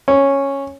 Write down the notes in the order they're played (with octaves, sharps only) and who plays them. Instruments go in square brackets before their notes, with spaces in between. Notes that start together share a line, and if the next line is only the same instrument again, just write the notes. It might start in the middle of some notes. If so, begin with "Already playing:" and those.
[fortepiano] C#4